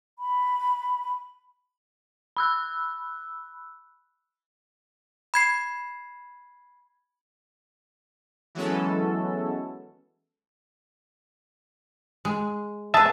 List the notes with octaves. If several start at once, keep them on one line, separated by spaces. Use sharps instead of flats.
B5
B5 E6 F#6
B5 G#6 C7
E3 F#3 G#3 B3 C#4 A4
G#3
G#4 B4 E5 A5